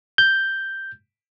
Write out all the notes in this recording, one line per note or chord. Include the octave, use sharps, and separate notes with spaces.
G6